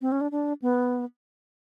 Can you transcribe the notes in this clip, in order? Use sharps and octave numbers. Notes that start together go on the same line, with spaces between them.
C4
C#4
D4
D4
B3